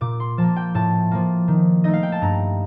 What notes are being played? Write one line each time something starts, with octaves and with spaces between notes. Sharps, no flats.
A#2 D6
C6
F3 A#3 A5
G5
A2 A5
F3 A#3
D#3
A3 D#4 D#5
F5
G5
A5
G2 A#5